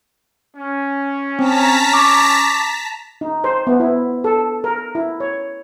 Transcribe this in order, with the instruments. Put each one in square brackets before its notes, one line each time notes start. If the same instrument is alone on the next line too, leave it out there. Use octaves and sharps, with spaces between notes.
[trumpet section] C#4
[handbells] C4 [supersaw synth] A5 A#5 B6
[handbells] C#6 D6
[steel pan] D#4
C5
B3
E4
A4
A#4
E4
C#5